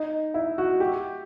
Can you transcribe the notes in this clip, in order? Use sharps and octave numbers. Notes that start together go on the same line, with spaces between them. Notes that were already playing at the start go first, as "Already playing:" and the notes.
Already playing: D#4
E4
F#4
G4